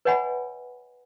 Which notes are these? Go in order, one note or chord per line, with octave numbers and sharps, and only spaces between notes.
B4 C#5 D#5 F#5 G#5 B5